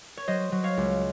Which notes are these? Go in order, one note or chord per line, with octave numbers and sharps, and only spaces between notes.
C#5
F#3 C5 D#5
F#3
C#5 F5
C#2